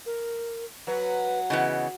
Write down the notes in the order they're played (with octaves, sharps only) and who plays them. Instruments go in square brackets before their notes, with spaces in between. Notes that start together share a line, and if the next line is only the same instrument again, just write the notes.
[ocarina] A#4
[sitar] F#3 [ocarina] B4
[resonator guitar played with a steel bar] C#3 E3 B3 [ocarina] D#5